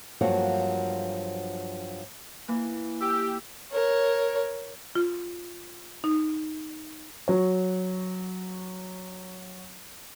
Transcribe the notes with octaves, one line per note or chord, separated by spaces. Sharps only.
G2 F3 F#3 A#3 F#4
E3 A#3
G4 E6
A#4 C#5
F4
D#4
F#3 C#5